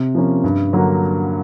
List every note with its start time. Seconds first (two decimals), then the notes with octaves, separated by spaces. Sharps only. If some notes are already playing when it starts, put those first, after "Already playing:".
Already playing: C3
0.15 F3 A#3 C#4
0.44 G2
0.73 D3 F#3 A#3